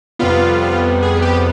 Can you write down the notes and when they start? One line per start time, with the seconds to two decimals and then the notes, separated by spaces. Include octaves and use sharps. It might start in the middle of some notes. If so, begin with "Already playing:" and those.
0.19 F2 C3 G3 B3 F4
1.03 G#4
1.22 G4